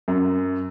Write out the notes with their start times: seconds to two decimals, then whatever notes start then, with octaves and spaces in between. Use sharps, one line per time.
0.08 F#2